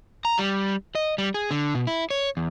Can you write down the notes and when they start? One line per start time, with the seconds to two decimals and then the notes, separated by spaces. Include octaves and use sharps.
0.25 A#5
0.38 G3
0.95 D#5
1.18 G3
1.34 G#4
1.51 D3
1.75 B2
1.87 E4
2.10 C#5
2.37 E2